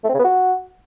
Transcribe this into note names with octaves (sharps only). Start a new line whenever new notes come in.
A3
C4
C#3
B3
F#4